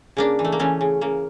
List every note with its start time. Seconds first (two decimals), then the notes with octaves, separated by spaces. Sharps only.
0.17 C#3 A#3 D4
0.39 E3
0.45 A3
0.52 A#3
0.59 E3 A3 C#4
0.81 C#3
1.01 C#3 A#3